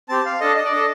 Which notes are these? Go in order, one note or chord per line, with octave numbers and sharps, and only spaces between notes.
C4 G4 A5
F5
D4 A4 D#5
D#5
D5
D4 A4 D#5